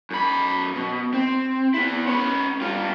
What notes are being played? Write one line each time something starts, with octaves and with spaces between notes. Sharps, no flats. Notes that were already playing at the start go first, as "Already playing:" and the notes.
F#2 B5
B2
C4
B3 E4
C#4 B4
G2 F4